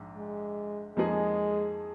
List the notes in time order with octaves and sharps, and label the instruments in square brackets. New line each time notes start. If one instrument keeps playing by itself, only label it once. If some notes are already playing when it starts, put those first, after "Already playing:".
Already playing: [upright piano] A#1 G#2
[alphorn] G#3
[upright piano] F2 F3 A#3 D#4 G#4 [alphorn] G#3